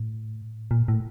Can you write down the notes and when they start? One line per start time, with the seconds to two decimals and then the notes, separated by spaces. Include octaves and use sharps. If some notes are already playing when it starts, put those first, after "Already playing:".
Already playing: A2
0.71 A#2
0.88 A2